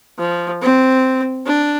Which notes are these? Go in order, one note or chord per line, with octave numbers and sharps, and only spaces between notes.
F3
C4
D4